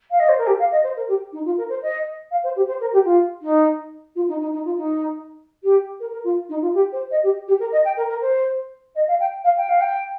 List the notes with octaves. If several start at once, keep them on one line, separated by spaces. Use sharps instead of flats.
F5
D#5
C5
A#4
G4
F5
D#5
C5
A#4
G4
D#4
F4
A#4
C5
D#5
F5
C5
G4
C5
A#4
G4
F4
D#4
F4
D#4
D#4
D#4
F4
D#4
G4
A#4
A#4
F4
D#4
F4
G4
C5
D#5
G4
G4
A#4
D#5
G5
A#4
A#4
C5
D#5
F5
G5
F5
G5
F5
G5